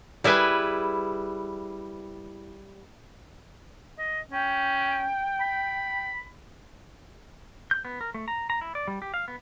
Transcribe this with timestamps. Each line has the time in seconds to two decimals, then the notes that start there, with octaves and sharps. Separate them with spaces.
0.24 G3 E4 G#4 B4
3.99 D#5
4.31 C#4 G5
5.41 B5
7.71 G6
7.85 B3
8.01 A#4
8.14 A3
8.28 A#5
8.50 A#5
8.61 E4
8.75 D5
8.88 G3
9.02 G4
9.14 F5
9.28 B3